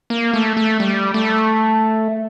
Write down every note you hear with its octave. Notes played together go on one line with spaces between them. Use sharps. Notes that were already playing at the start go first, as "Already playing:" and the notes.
A#3
A3
A3
G3
A3